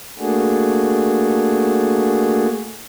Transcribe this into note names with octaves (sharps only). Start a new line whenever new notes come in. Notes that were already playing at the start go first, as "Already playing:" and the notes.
A3 A#3 D4 F#4 G#4